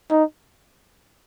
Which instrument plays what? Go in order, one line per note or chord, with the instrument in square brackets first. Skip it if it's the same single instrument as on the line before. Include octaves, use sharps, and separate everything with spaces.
[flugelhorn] D#4